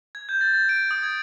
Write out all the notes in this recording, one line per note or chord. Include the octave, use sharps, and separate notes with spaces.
G#6
G6
A6
A6
D7
D#6
G#6